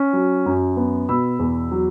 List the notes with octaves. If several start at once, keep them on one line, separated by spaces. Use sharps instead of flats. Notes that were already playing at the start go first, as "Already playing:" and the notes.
Already playing: C#4
F#3
F#2
B3
B2 B5 E6
E2
F#3